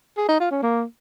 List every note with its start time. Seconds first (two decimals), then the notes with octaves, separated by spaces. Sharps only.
0.17 G#4
0.29 D#4
0.40 F4
0.51 C#4
0.62 A#3